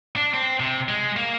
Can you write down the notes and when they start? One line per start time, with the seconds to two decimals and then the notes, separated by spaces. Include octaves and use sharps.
0.16 D4
0.34 C4
0.60 C3
0.89 G#3
1.17 A#3